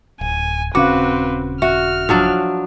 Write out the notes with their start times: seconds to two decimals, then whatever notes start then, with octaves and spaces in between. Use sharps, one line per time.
0.21 D1 G#5
0.75 D#1 C#3 C4 C#4 F#4 B4 F5 D6
1.62 F#4 E5 F6
2.09 F3 F#3 D4